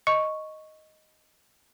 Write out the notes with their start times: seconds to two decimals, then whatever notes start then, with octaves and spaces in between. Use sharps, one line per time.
0.07 D#5 C#6